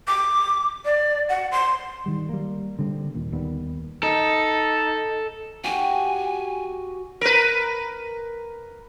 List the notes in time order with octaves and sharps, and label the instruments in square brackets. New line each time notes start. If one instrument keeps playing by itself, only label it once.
[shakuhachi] D6
D5
F#5
C6
[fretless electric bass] D#3 G3
G3 A#3
D3 G3 C4
D#2 A#2
D#2 D#3 G3 B3
[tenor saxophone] D#4 [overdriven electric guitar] A4
[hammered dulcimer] F#4 G4 [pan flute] G#5
[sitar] A#4 B4